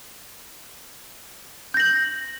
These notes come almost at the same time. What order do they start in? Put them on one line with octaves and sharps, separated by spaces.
G6 A#6 F#7